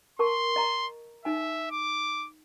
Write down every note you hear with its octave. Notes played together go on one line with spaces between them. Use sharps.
A#4 A5 C6 C#6
D#5 A#5
D#4 E5 G#5
D6